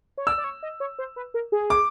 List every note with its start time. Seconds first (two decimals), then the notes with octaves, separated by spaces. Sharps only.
0.18 C#5
0.27 D5 E6
0.38 D5
0.44 C#5
0.63 D#5
0.80 C#5
0.99 C5
1.16 B4
1.34 A#4
1.52 G#4
1.70 D6